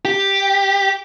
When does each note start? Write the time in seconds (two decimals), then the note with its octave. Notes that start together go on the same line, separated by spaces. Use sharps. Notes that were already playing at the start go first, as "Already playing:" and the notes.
0.05 G4